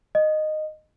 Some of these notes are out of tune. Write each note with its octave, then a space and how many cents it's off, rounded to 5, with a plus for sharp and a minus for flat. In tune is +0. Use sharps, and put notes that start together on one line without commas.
D#5 -10